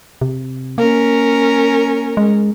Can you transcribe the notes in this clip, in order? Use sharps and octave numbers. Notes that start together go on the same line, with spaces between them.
C3
A#3 C#4 A#4
G#3